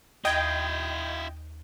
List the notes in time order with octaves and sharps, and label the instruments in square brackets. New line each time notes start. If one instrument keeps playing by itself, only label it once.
[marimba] D#2 [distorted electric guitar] E4 F5 [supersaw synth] D#5 G5 [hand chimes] G6 G#6